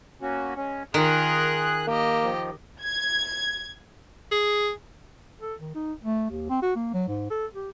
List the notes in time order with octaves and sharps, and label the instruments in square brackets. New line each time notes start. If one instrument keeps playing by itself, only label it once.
[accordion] A#3 C#4 F#4
G#3 C#4
[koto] D#3 [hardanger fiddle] F4 A#4 [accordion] G#4 F#6
[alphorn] A#3 [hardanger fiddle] G4 D#5
[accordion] D#3 F3
[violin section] G#6
[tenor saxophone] G#4
[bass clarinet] A4
D#3
D#4
A3
D#2
C4
F#4
A#3
F#3
G#2
A4
G4